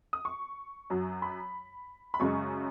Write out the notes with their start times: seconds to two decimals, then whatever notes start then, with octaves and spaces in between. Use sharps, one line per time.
0.13 D#6
0.25 C#6
0.90 F#2 F#3
1.22 B5
2.14 B5
2.19 F#2 C#3 G#3 C#6